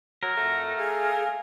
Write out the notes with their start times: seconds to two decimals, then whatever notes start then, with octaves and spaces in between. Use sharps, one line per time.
0.23 F#3 A#4
0.37 F2 A3 F#5
0.77 G#4 F5 G#5 F6